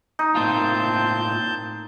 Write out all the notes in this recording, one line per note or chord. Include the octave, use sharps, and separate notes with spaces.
D#4
A2 A#3 C4 F4 A5 G6